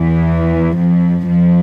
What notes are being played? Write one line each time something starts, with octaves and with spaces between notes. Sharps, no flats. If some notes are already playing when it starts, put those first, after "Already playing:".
Already playing: E2 E3
F2 F3
F2 F3